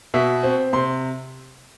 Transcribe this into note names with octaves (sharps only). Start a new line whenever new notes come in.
B2 E5
C4
C3 C6